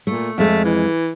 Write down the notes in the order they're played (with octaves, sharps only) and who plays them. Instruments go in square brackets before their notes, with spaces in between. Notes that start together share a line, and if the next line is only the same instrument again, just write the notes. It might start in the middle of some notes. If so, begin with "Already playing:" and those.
[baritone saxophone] A#2 [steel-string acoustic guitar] A3
[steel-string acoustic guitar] F2 G#3 [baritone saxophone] A3
[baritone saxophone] E3